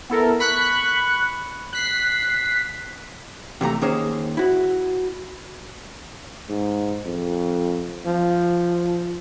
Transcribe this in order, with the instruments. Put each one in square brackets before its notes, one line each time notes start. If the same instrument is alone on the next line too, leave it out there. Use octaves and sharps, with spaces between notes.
[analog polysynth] B3 E4 A4 A#4
B5 C#6 F#6
F#6 B6 C7
[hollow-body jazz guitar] C3 E3 A3 A#5
D#3 A#3 C#4 G#4 C5
E4 F#4
[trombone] G#2
F2
F3